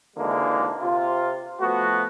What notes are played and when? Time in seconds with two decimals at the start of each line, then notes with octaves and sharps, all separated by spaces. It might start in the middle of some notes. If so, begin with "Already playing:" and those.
0.17 G#1 D3 E3 G#3 A#3
0.81 C3 F4
1.60 F3 A3 B3 F#4